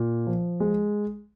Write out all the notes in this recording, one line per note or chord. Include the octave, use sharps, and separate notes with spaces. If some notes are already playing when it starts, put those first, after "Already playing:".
Already playing: A#2
F3
G#3